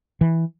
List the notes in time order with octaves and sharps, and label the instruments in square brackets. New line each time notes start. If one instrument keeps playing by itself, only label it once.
[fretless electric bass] E3